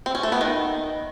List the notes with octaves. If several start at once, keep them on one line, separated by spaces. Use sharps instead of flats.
C4
C#4
A3
B3
D#3